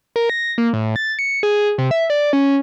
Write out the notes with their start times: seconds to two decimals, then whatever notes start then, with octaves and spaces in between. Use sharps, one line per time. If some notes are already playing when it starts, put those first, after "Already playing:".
0.16 A#4
0.30 A#6
0.58 A#3
0.73 A2
0.96 A6
1.19 C#7
1.43 G#4
1.78 C3
1.91 E5
2.10 D5
2.33 C#4